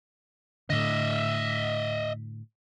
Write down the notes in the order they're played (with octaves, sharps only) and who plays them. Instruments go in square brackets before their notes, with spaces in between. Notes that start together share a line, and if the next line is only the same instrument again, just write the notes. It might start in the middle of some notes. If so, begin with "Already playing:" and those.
[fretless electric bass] A2 D3 [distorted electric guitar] D#5 E5